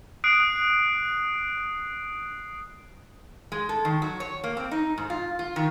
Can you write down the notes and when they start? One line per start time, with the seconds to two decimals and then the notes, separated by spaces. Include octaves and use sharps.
0.24 D#6 F#6 C7 D7
3.52 G#3
3.69 A4
3.85 D#3
4.02 F#3
4.20 C#5
4.44 A#3
4.57 C4
4.71 D#4
4.98 G#2
5.10 F4
5.39 F4
5.56 D#3